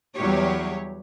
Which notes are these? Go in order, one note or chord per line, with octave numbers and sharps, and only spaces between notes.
E2 F#3 G3 G4 C#5